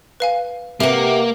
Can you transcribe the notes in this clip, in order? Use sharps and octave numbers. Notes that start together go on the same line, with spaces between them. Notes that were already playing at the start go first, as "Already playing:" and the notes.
B4 F5 G#5
C3 A#3 G4 B4 E5 F#5